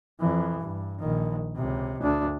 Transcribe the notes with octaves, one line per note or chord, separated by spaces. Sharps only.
F2 E3
G2
A#1 D#3
C#2 C3
D2 D4